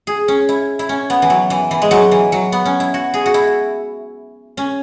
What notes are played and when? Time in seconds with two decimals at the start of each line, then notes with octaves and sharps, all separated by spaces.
0.07 G#4
0.28 C#4
0.49 E4
0.79 E4
0.89 C#4
1.10 B3
1.22 E3
1.30 F#3
1.50 E3
1.71 E3
1.82 G#3
1.91 F#3
2.12 E3
2.32 F#3
2.52 B3
2.65 C#4
2.80 E4
2.94 F#4
3.14 G#4
3.26 F#4
3.34 E4
4.57 C#4